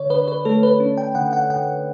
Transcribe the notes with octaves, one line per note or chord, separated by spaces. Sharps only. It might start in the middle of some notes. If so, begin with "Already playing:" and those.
Already playing: D3 C#5 D5
D3 B4
B4
A3 A4
B4
C#4
G5
D3 F#5
F#5
D3 F#5